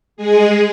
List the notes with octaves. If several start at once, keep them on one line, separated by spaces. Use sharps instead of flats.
G#3 G#4